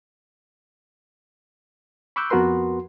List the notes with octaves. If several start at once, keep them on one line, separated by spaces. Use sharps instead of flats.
B5 C#6 D6 E6 F#6 G6
F2 B3 F#4 A#4 B4 C6